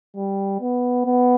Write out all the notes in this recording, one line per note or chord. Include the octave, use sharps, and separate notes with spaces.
G3
B3
B3